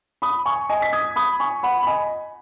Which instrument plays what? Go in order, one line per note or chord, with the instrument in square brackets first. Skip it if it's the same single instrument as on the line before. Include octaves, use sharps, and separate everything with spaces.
[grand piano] B5 D#6
G#5 C#6
D#5 G#5
B6
D#6 G#6
B5 D#6
G#5 C#6
F#5 B5
B5
D#5 G#5